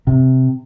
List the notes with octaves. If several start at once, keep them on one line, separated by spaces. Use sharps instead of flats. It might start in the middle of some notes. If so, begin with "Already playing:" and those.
C3